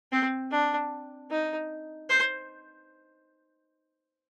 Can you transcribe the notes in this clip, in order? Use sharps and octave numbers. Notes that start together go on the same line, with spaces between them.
C4
D4
D#4
C5